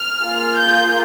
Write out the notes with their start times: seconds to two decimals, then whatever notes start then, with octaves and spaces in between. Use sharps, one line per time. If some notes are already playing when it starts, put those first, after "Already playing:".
Already playing: F6
0.22 A#3 F4 G#4
0.57 G6